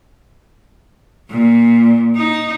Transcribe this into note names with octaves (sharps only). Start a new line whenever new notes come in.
A#2
D#4